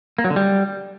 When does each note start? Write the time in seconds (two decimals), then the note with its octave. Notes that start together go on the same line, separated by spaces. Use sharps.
0.18 A#3
0.24 F#3
0.30 D3
0.36 G3